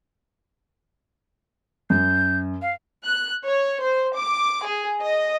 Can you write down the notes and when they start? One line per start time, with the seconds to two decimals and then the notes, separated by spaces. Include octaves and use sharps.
1.90 F#2 G6
2.62 F5
3.06 F#6
3.45 C#5
3.81 C5
4.16 D6
4.66 G#4
5.01 D#5